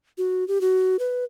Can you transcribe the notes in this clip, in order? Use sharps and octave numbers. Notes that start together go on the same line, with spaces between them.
F#4
G4
F#4
B4